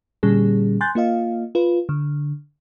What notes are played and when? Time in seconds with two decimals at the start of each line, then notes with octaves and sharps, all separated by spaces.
0.23 A#2 D3 G3 C#4 G#4
0.81 G#5 C6 F#6 G6 A6
0.95 A#3 F4 D#5 F5
1.55 F4 B4
1.89 D3